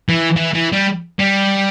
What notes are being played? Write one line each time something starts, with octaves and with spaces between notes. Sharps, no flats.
E3
E3
E3
G3
G3